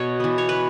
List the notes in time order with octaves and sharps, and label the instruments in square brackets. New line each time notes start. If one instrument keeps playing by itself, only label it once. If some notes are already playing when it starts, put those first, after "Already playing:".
Already playing: [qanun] B2 C#5
E3 B3
C#5
B4